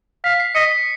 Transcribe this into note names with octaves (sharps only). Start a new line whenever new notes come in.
F5 B6
C7
D#5 B6 C#7
B6